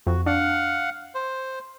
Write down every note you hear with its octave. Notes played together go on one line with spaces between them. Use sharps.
F2 F#4
D4 F5 F#5
C5